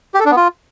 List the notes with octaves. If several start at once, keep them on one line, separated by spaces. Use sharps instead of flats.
G4
A4
D4
B3
F4